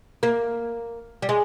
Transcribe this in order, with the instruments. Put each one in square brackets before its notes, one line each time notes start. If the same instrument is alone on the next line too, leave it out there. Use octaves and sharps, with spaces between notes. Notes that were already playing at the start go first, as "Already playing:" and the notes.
[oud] A#3
G3
G#3